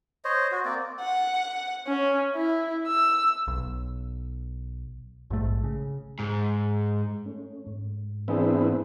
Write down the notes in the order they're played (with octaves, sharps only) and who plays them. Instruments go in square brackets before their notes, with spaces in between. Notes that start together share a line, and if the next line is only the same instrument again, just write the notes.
[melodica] C5 C#5 D#5
F#4
A#3 C4 D5
[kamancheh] F#5
C#4
E4
E6
[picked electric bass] B1
A#1 G#2 A3
C#3
[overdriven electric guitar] G#2
[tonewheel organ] A3 C#4
G#2
[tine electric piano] E3 D4 G#4 [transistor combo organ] B3 C4 E4